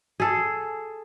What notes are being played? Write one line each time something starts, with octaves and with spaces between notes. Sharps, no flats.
G#4 A4